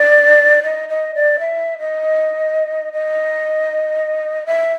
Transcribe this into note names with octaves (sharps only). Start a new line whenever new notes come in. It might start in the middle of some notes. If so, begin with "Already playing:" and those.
Already playing: D5
D#5
D#5
D5
E5
D#5
D#5
E5